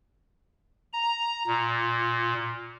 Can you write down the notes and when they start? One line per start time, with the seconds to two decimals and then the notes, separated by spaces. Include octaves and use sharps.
0.93 A#5
1.47 A#2